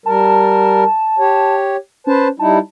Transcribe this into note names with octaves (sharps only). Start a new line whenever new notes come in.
G3 A#4 A5
G4 C#5
C#4 B4 C5 A5
G3 D#4 E4 A5